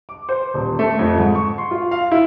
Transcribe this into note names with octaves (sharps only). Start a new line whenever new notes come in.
D6
C5
D#1
A3
F2
G#2
C#6
C6
F4
F5
E4